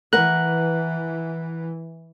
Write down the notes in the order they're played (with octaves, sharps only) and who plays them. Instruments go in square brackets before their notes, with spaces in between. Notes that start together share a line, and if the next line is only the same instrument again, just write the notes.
[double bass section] E3 [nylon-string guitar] A#4 B4 F#5 [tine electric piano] F#6